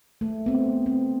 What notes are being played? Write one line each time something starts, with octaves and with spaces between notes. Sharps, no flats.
A3
B3 C4
C4